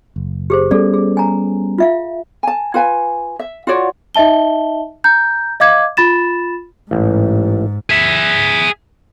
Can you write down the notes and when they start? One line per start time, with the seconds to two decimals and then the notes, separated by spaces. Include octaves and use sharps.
0.16 F#1
0.50 G4 G#4 C5
0.71 G3 B3 C#4 G#4 A4 D5
0.94 G#4
1.17 G#5 A#5
1.78 F4 E5 F5
2.43 G#5 A5
2.74 F4 B4 G#5
3.39 E5
3.67 F4 F#4 C#5 D5
4.15 D#4 D#5 E5 A5 G7
5.04 A#5 G6
5.60 D#5 F5 D6 G#6
5.97 F4 B5 A6 E7
6.91 A1 G#2
7.90 G#4 E5